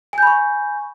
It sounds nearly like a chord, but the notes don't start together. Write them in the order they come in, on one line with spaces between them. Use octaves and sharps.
G#5 G6 B5 C#6